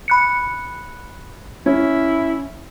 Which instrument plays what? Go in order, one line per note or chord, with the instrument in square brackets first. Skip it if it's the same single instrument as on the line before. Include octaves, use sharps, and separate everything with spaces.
[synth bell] B5 F#6 C#7
[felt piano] C#4 [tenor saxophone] E4